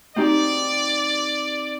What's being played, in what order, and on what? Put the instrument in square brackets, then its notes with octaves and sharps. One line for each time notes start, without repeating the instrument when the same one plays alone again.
[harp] C4 D#4 G4 [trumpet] D5